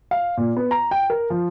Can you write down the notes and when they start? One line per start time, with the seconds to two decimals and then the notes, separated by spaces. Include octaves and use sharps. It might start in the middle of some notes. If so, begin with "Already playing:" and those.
0.11 F5
0.37 A#2
0.57 B3
0.71 A#5
0.91 G5
1.10 A#4
1.30 F3